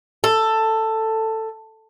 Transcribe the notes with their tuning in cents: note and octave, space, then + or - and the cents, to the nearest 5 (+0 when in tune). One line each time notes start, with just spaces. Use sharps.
A4 +10